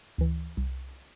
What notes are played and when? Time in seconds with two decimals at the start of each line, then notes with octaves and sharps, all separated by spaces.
0.18 D2 E3
0.57 C2